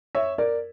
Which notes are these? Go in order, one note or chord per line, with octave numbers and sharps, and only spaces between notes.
C#5 E5
A#4 D5